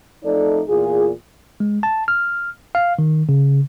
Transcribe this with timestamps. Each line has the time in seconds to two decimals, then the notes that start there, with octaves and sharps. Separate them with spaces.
0.24 F2 A3 D#4 A4 D5
0.69 E2 A#2 F4 G#4
1.60 G#3
1.83 A5
2.08 F6
2.75 F5
2.99 D#3
3.29 C#3